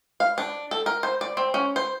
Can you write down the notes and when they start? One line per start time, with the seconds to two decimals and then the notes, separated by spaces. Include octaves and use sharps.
0.20 F5
0.38 D4
0.71 A4
0.86 A#4
1.03 C5
1.21 D5
1.37 C4
1.54 C#4
1.76 C5